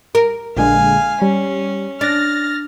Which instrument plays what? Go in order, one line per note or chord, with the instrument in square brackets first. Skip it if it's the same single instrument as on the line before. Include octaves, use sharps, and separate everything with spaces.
[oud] A#4
[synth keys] A#1 D3 G#3 [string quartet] F5 G#5
[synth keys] G3 [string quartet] C#4
[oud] D4 [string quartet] F6 [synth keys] A6 A#6